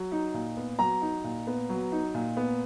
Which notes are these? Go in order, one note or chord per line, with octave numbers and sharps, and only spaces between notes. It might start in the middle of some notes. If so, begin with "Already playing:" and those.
Already playing: F#3
D#4
A#2
B3
F#3 A#5
D#4
A#2
B3
F#3
D#4
A#2
B3